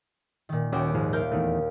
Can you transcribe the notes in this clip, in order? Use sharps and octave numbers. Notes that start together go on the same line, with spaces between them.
A#2 D#3
D#2 C#4 F#4 G5 D6
G#2 F3 G#3
A#4 F5 G6
E2 D#3 A3